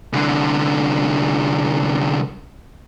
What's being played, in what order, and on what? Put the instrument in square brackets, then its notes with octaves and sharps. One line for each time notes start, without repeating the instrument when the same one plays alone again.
[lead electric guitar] C2 D3